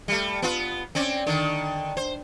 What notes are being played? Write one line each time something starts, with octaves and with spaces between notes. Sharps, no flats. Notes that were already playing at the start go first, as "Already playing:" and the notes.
G3 A3
B3 F4
C4 C#4 D5
D3 D#3
C5